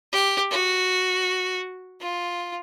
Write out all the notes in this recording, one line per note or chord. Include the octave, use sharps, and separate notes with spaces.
G4
F#4
F4